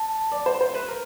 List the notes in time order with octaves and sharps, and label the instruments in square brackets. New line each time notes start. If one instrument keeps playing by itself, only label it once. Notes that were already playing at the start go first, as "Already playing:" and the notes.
Already playing: [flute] A5
[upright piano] D5
C5
C5
B4
A#4